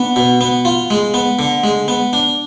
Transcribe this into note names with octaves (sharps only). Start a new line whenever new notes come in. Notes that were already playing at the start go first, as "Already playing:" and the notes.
Already playing: B3 D4
B2
B3
F4
G#3
B3
D3
G#3
B3
D4